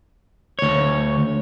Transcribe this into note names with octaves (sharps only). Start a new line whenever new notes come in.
D2 C#5